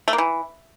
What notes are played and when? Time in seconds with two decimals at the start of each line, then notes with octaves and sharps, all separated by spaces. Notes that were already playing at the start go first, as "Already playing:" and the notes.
0.08 A3
0.13 A#3
0.18 E3